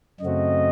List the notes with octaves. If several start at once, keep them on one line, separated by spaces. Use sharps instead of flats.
F#2 C#3 A3 C4 F#4 D#5